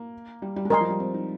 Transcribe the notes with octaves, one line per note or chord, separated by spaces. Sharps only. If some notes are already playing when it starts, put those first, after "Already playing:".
Already playing: A#3
G3
G3
G#3
G3 A#4 D#5 G#5 C6
F3
G3
C4
D#4